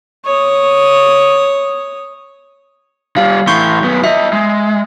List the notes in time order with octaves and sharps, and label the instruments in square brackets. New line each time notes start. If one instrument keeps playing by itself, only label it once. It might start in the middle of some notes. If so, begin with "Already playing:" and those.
[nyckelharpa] C#5 D#6
[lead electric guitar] G3 F4 [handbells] F5
[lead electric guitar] A2 E3 [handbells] C6 C#6 G6
[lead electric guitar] F#2 B3
[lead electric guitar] F4 D#5 [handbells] E5
[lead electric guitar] G#3